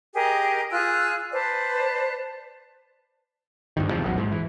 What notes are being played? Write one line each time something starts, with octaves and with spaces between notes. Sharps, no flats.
G4 G#4 A#4 D#5
F4 G#4 E6 F#6
B4 C5 D5 A5
D2 G2 D#3
E2 C3 F3
D#1 G#1 F#3
G#2
E3